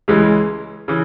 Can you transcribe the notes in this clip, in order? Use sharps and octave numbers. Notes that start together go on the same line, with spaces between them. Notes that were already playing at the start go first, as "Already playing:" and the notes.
C#2 C#3 E3 G#3
C#3 E3